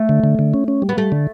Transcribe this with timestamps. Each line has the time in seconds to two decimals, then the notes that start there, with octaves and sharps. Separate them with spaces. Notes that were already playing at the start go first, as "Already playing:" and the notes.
Already playing: A3
0.09 D3
0.24 D3
0.39 D3
0.54 C#4
0.68 C#4
0.82 G3
0.89 B3
0.97 G3 A3
1.12 D3